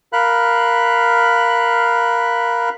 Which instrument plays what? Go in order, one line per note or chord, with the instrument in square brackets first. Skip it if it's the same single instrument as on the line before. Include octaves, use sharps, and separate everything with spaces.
[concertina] A#4 F5 B5 F#6